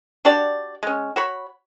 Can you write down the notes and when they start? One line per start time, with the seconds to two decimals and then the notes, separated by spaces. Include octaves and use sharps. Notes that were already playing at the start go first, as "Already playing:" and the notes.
0.25 D4 F#4 G4 D5
0.83 G#3 C#4
1.16 F#4 C#5 B5